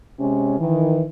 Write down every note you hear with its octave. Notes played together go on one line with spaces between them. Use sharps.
C3 G#3 C#4
D#3 E3